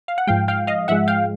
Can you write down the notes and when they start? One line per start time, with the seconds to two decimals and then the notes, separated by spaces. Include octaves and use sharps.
0.08 F5
0.18 F#5
0.27 G#2 F3 G#3 F5 G5
0.48 F5 G5
0.67 D#5 F5
0.88 G#2 F3 G#3 E5 F#5
1.08 F5 G5